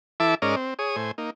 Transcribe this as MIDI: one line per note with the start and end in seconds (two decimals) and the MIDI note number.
0.20 0.35 52
0.20 0.35 64
0.20 0.35 69
0.20 0.35 76
0.20 0.35 81
0.20 0.35 86
0.42 0.55 44
0.42 0.55 61
0.42 0.55 70
0.42 0.55 74
0.42 0.55 75
0.42 0.55 89
0.56 0.74 60
0.79 0.96 68
0.79 0.96 73
0.79 0.96 87
0.96 1.11 45
0.96 1.11 72
0.96 1.11 80
1.18 1.30 58
1.18 1.30 63